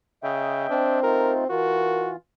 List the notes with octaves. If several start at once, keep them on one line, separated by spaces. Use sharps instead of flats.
C#3 D#5 E5 G5
C4 D4
A3 D#4 F4 A#4
E3 F4 F#4 A#4